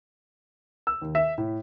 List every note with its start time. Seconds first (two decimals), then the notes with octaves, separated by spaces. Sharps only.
0.87 E6
1.02 D#2
1.15 E5
1.38 A2